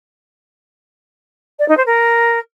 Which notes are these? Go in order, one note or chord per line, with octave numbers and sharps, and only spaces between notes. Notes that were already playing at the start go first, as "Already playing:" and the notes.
D5
D#4
C5
A#4